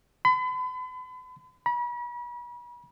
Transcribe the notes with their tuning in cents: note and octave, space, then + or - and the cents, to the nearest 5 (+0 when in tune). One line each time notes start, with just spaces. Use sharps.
B5 +40
B5 -40